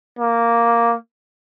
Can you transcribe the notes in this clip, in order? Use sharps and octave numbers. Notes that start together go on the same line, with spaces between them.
A#3